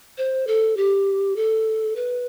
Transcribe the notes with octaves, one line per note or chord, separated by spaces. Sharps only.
C5
A4
G4
A4
B4